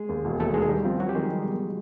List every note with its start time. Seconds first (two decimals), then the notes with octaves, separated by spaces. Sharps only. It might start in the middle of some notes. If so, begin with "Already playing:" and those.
Already playing: G#3 G#4
0.09 D#2
0.25 E1
0.40 D#2 A3 A4
0.54 D#3 G#3 G#4
0.69 D#3 G3 G4
0.85 F3 C4 F4
0.99 F#3 C4 F#4
1.09 G4
1.15 D#3 G#3 G#4
1.30 G3
1.45 B2